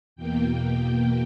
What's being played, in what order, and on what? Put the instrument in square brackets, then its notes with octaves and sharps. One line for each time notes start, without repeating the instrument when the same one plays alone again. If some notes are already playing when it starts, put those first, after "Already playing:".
[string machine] E2 B2 A#3 G5